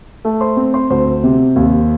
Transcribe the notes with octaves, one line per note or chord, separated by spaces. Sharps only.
A3
C5 C6
C4
C5 C6
D2 C5 C6
C3
D#2